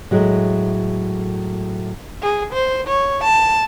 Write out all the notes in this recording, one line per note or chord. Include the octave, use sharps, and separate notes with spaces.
A2 F#3 G#3 A3
G#4
C5
C#5
A5